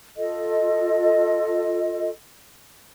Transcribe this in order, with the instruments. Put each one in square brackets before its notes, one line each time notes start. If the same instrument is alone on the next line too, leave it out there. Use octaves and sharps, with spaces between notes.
[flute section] F4 A4 D#5